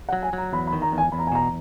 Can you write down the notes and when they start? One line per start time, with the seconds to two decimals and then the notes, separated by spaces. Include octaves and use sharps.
0.09 F#5
0.13 F#3
0.23 G#5
0.33 F#3 A#5
0.53 E2 B5
0.67 B5
0.72 D#3
0.82 A#5
0.92 E2
0.98 G#5
1.12 E2 B5
1.19 A#5
1.27 G#5
1.32 B2 A#5